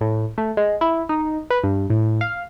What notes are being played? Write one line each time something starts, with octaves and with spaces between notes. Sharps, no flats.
A2
A3
G#3
E4
D#4
B4
G2
A2
F5